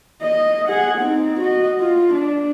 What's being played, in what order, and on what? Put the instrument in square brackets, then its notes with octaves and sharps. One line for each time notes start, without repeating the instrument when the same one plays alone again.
[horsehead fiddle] D#5
G#4 F#5
C4 D#4
F#4 D#5
F4
D4